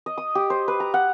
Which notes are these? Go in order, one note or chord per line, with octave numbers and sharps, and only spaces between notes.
D#5
D#6
G4
C5
B4
A#5
F#5